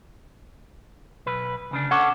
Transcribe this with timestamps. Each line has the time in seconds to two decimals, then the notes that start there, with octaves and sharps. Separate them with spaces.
1.26 B1 B4
1.71 D2 C#3 D4
1.91 C#4 D4 A4 F#5 C#6 D6